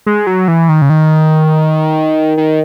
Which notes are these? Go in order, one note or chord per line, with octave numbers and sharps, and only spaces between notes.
G#3
F#3
E3
D#3
C#3
D#3
D#3